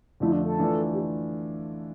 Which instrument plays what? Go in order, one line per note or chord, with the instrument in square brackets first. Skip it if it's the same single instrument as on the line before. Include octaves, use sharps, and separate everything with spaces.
[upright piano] F2 D3 F3 A3 [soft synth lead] E4
[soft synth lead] D4
A4
[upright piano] E3 A3 D4 F4
[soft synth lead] G4